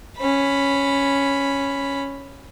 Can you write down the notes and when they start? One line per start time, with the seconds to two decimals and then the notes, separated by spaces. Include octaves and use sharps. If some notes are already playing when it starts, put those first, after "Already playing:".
0.18 C#4 B5